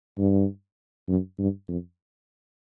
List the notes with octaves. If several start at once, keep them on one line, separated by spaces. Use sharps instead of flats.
G2
F#2
G2
F2